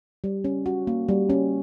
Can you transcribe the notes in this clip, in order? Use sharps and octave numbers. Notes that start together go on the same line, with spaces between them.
G3
C#4
F#4
A#3
G3
C#4